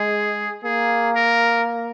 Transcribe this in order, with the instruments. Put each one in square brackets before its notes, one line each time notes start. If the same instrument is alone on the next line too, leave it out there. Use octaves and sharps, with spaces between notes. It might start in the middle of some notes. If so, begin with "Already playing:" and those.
Already playing: [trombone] G#3 [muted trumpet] G#4
[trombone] A#3 [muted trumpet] G#4
[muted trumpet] A#4